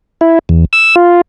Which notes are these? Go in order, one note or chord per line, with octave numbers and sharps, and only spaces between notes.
E4
E2
E6
F4